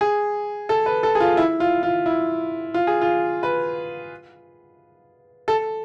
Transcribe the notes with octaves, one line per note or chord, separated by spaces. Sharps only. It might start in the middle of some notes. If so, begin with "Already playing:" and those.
G#4
A4
B4
A4
G#4
F4
E4
F4
F4
E4
F4
G#4
F4
B4
A4